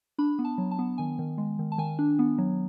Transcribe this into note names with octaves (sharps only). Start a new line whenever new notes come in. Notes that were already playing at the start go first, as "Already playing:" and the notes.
D4 B5
B3
A5
F#3
A5
B3
D#3 G#5
D#3
G#3
D#3
A5
D#3 G#5
D4
B3
F#3